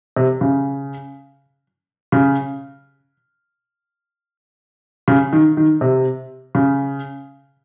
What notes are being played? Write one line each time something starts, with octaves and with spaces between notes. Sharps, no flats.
C3
C#3
C#3
C#3
D#3
D#3
C3
C#3